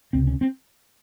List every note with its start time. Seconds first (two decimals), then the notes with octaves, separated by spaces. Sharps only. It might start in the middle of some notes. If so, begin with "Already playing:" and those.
0.13 C#2 C3 C4
0.27 C#4
0.41 C4